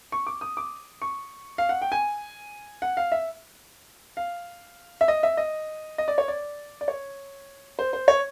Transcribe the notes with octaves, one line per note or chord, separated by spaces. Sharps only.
C#6
D6
D#6
D6
C#6
F5
F#5
G5
G#5
F#5
F5
E5
F5
E5
D#5
E5
D#5
D#5
D5
C#5
D5
D5
C#5
C5
C5
C#5